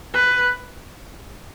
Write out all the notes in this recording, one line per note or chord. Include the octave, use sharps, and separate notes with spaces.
B4